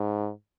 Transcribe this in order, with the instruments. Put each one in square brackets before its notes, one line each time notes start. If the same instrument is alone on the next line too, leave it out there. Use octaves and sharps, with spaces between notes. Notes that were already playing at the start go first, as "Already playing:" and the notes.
Already playing: [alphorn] G#2